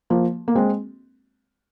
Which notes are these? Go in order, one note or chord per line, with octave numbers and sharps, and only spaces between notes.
F3 A#3
A#3
G#3 C4